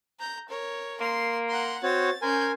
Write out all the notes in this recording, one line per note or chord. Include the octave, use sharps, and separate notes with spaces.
A#5 G6
A#4 C#5
A#3 C6
F#5 A#5 C6
C4 F#4 C#5 A6
C#4 A#4 C5 G#5 G6